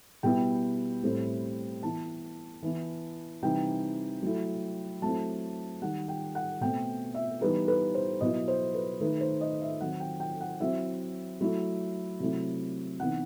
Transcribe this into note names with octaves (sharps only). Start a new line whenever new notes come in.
B2 G3 B3 E4 G5
A2 G3 C4 E4
E3 B3 E4 A5
E3 B3 E4
C3 E3 G3 D#4 G5
F#3 A3 E4
F#3 A3 C4 E4 A5
D#3 G3 D#4 F#5
G5
F#5
B2 A3 C4 G5
E5
E3 G3 B3 D#4 B4
B4
C5
B2 F#3 B3 E4 D#5
C5
B4
D#3 A3 D#4 B4
C5
D#5
E5
D#3 F#3 C4 F#5
G5
G5
F#5
F#3 C4 E4 E5
F#3 A3 E4
C3 F#3 A3 E4
C3 E3 B3 D#4 F#5